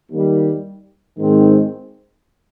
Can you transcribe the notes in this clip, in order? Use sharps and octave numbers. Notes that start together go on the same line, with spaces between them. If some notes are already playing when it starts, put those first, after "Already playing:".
D#2 D#3 G3
G#2 D#3 G#3 C4